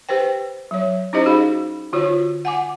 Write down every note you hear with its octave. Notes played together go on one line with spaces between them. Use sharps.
G4 B4 C5 G5
F#3 C#5
C#4 D#4 E4 G4 C5 D#5
F#4 G#4 F5 B5
D3 F4 F#4 C#5
F#5 G#5 D6